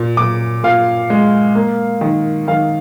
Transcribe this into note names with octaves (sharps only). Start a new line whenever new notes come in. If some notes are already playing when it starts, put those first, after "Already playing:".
Already playing: A#2
A#2 D6
A#2 F5
G#3
A#3
D#3
D#3 F5